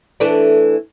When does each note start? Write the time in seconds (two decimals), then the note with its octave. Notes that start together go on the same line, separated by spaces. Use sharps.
0.20 E3 A3 D4